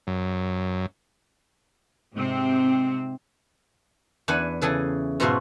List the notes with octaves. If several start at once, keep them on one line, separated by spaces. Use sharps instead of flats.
F#2
G#2 C3 C4
E2 D4 B4 F#5 G#5
C#3 E3 G#4 A4
G#2 B2 F4 F#4 E5 C6